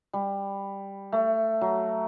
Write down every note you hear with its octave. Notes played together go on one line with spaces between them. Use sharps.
G3
A3
F#3